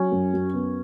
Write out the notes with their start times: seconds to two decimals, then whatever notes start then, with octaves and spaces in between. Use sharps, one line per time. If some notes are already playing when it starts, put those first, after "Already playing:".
Already playing: F#3 C#4
0.12 F#2
0.33 F#2
0.54 B3